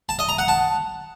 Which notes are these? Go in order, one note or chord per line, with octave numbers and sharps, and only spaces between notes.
A5
D#5
A#5
F#5
A5